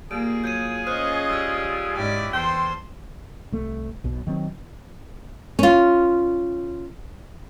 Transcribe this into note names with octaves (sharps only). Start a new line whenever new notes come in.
G3 A#3 F4 G#4 D7
F#3 G6 G#6 D#7
C#4 C5 C#5 D#5 F6 F#6
G3 E6 G#6
G#2 C#4 E4 G4 D5
E2 A4 C5 G5 C6
C2 A3
B1 B2
D#3 F#3 C4
C#4 F4